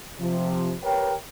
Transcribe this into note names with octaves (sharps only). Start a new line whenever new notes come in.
C3 F3
G4 A#4 B4 C#5 G5